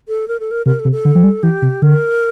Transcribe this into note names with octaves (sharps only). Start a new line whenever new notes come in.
A4
A#4
A4
A#4
C3 A#4
A4
C3
A4
D3
F3
G3
E3 G4
C3
D3 A#4